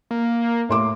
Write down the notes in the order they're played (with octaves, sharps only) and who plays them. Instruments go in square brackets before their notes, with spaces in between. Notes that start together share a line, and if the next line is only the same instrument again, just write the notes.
[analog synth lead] A#3
[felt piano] A2 C6 D6